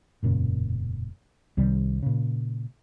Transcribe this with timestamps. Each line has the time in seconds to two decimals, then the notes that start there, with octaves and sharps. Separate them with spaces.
0.23 E1 F#2 A#2 C#3
1.57 C2 C3 D#3 G3
2.03 A#2 C#3